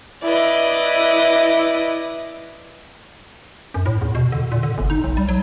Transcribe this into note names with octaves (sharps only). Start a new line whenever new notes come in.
E4 B4 D5 D#5
F#2
A2
E2
B2
D3
A#2
D3
G1
D#4
B1
G3
F#3